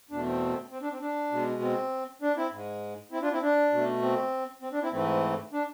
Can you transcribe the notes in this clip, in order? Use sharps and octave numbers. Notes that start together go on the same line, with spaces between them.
E2 B2 A3 D4
C4
C4
D4
C4
D4
B2 G#3
C4
D4
C4 E4
G#2 G#3
C4 E4
D4 F4
C4 E4
D4
B2 A3
C4
C4
D4
C4 E4
G#2 E3 A3 C4
D4